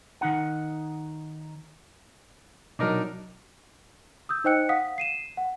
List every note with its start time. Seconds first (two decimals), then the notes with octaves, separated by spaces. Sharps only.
0.21 D#3 D#4 F#5
2.79 B2 F#3 D4 D#4 A#4
4.29 D#6 E6 G6
4.44 D#4 C5 D#5 G5 F#6 C#7
4.69 F5 F#5 D#6 B6
4.98 C7 D#7 E7
5.37 F#5